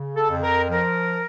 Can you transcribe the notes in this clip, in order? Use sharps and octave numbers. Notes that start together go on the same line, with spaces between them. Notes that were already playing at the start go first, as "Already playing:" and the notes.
Already playing: C#3
A4
F2
A#4
F3 A#4